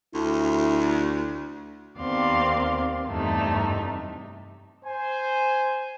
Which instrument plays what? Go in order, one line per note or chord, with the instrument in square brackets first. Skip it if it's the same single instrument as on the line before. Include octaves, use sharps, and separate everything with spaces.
[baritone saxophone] D2 [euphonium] E4
[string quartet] D#2 B3 C4 D5 F5 C6
E2 G2 C3 A3 D#4
[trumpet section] C5 G#5